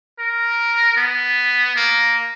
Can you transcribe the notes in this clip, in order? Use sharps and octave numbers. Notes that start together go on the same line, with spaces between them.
A#4
B3
A#3